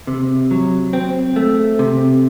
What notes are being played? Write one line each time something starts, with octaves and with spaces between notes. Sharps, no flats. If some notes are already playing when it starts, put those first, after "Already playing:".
C3
F#3
C4
A3
C3